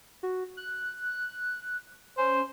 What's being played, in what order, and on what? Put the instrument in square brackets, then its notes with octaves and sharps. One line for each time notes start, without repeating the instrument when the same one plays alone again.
[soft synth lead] F#4
F#6
[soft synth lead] C#4 [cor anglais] C5